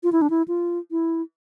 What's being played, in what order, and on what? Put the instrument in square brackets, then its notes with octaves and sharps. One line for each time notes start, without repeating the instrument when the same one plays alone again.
[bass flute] F4
E4
D4
E4
F4
E4